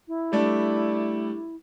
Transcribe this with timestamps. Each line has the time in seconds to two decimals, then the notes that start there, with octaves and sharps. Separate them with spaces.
0.08 E4
0.32 G3 A3 D4